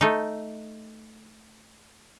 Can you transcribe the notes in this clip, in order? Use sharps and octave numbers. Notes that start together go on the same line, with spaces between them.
A3 D#4